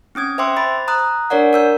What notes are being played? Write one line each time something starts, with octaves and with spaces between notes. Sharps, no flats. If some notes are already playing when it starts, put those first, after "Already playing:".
C4 C#4 D#6 G#6
C5 E5 G5 C6 D6 E6
C5 B5 A6
A#5 D#6 F#6
D4 A#4 C#5 D5 F#5
A#4 E6 G6